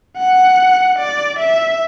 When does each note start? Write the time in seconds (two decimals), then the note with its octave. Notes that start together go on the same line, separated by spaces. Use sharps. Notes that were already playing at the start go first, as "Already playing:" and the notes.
0.18 F#5
0.99 D5
1.39 E5